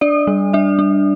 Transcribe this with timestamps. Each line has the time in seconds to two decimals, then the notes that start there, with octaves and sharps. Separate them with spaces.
0.01 D4 D5
0.27 G3
0.53 D4 E5
0.79 D4